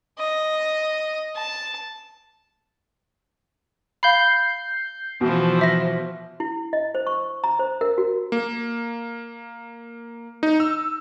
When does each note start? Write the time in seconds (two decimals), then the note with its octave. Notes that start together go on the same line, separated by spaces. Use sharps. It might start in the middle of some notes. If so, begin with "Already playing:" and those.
0.19 D#5
1.36 A5
4.03 F5 B5 G6 C7
5.21 B2 E3 F3
5.59 C5 E5 A#6
6.40 E4
6.73 D#5
6.95 C5
7.07 C#6
7.44 A#5
7.59 C5
7.81 A#4
7.98 F#4
8.32 A#3
10.43 D#4
10.60 E6